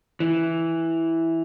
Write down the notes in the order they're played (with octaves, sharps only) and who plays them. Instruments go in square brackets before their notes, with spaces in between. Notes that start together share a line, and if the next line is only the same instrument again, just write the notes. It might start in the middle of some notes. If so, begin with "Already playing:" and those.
[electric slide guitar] E3